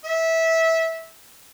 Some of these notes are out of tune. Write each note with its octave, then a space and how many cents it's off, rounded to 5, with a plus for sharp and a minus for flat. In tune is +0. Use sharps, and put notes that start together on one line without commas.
E5 -15